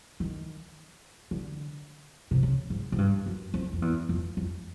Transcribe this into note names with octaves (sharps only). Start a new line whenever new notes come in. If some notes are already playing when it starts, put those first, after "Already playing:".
D#3
D3
C3
C#3
G#2
G#2
G2
F#2
F2
F2
E2
F2
F2